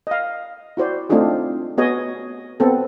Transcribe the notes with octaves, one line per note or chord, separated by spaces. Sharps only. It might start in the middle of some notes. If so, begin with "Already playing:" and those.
D#5 F5
E4 F#4 C5 D5
A3 C4 D4 D#4 F4 G#4
B3 F#4 G#4 C#5 D#5 G#5
B3 C4 A4